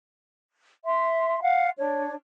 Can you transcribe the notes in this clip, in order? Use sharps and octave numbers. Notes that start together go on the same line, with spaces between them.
E5 C6
F5 F#5
D4 C#5